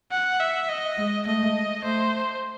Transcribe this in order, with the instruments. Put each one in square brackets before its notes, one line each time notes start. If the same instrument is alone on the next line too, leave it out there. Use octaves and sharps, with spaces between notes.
[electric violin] F#5
E5
D#5
[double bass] G#3
[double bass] A3 [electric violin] D#5
[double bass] A3 [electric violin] C5